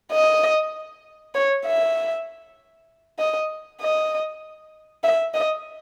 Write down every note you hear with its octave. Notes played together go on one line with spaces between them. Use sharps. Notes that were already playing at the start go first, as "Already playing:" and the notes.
D#5
C#5
E5
D#5
D#5
E5
D#5